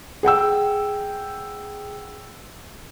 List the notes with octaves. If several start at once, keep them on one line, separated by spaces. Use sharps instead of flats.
G#4 F#5 G5 E6